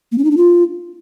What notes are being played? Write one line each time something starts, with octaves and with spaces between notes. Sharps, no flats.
A#3
C#4
D#4
D4
F4